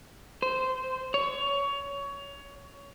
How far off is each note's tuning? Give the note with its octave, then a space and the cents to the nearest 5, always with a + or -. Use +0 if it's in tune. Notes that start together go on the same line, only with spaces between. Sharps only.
C5 -10
C#5 +20